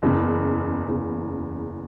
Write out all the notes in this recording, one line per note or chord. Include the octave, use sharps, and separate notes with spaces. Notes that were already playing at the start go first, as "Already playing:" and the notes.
F#1 E2 C#3
F#1 E2 C#3